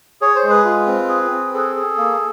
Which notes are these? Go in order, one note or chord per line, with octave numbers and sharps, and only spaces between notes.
G#4 C#5
C5
G#3
B4
F4
C4
G#4
C4
G#4 A4
G#4
A#3